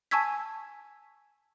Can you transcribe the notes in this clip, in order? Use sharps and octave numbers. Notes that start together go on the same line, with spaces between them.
G#5 A5 C#6 E6 G#6 B6